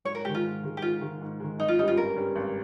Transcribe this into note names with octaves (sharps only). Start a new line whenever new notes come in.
G#2 C#5
A#4
D#3 G#3 G4
F4
G#2
D#3 G#3
G4
G#2 F4
D#3 G#3
G#2
D#3 G#3
G#1 D#4
F4
G2 G3 C#4 D#4
F4
G#1 A#4
G2 G3 C#4
G#1